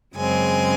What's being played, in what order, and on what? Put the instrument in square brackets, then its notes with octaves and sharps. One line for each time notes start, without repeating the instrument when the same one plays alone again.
[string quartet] F#2 C#3 G#3 C4 G#5